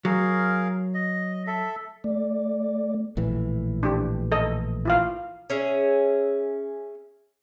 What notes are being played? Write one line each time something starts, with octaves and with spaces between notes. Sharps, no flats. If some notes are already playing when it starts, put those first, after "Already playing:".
F#3 G#4 A#4 F5
D#5
A4 E5
A3 D5
A#1 A2 E3
D4 G4
A4 D#5
E4 F4 F5
C#4 G#4 E5